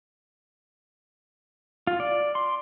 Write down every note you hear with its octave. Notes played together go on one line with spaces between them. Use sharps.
F4
D5
C6